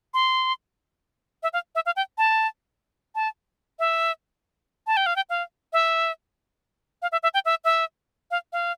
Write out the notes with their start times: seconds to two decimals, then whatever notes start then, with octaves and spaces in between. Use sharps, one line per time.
0.14 C6
1.43 E5
1.53 F5
1.75 E5
1.86 F5
1.96 G5
2.18 A5
3.15 A5
3.79 E5
4.87 A5
4.97 G5
5.06 F5
5.16 G5
5.30 F5
5.73 E5
7.02 F5
7.12 E5
7.23 E5
7.34 G5
7.45 E5
7.64 E5
8.31 F5
8.52 F5